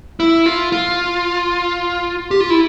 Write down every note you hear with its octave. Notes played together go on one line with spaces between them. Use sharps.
E4
F4
F4
G4
F4
E4